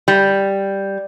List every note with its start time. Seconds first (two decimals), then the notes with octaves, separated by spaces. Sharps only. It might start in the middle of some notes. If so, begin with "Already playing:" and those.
0.08 G3